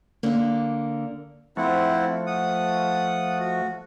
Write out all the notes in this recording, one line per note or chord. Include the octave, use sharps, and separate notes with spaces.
D3 A#3
F3 A3 C4 E4 F#5
F#5 D#6
F#4